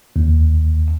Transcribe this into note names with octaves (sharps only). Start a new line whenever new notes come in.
D#2